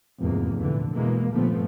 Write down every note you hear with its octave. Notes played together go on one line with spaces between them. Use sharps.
F1 E2 G#2 A#3
A#2 D3 E3
B2 E3 G#3 A#3
G1 A#2 F3 A3 B3 C4